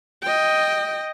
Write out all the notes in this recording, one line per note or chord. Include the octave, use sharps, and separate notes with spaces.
D#5 G5